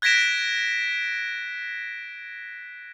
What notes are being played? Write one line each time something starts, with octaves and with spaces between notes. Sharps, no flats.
F#6 G#6 A#6 B6 D7 E7